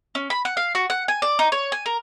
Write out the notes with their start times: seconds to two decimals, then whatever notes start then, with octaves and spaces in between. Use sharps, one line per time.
0.15 C#4
0.30 B5
0.45 F#5
0.57 F5
0.75 F#4
0.90 F#5
1.08 G#5
1.22 D5
1.39 D#4
1.52 C#5
1.72 G#5
1.86 A#4